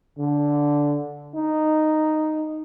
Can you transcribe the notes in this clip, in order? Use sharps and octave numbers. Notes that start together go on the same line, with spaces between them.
D3
D#4